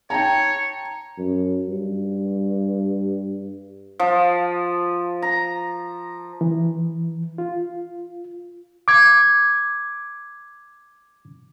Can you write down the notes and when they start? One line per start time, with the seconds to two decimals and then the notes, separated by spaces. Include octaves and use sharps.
0.10 C#5 G5 A5 A#5
1.18 F#2
1.68 G2
3.99 F3
5.22 A#5
6.41 E3
7.38 F4
8.88 D6 G#6